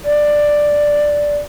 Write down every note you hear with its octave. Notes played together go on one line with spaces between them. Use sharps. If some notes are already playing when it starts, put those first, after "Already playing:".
D5